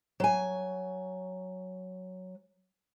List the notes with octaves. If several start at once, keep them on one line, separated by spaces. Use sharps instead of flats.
F#3 G#5